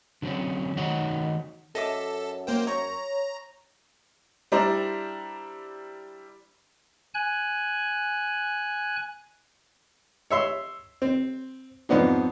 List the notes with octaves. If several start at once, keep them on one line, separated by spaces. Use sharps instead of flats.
D3 F#3 G#3 C4 C#4
D#3 D#4 F#4 C#5 D#5 F#5
F#2 A4 D#5 E5 D6
A#3 C5 G5
C#5 A#5 C#6
G3 D4 E4 C5 A#5
G#5 F#6
C#5 E5 C6
C4
F2 G#2 F3 B3 D4 D#4